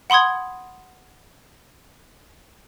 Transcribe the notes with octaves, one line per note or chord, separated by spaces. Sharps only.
F#5 B5 C6 D#6 G#6